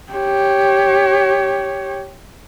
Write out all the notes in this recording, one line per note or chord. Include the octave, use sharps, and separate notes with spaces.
G4 C#5